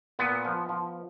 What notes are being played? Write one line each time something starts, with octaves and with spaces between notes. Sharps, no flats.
A#2 B3
F3
F3